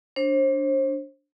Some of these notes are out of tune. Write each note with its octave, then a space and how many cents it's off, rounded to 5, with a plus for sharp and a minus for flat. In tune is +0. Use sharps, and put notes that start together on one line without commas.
D4 -10 C5 +35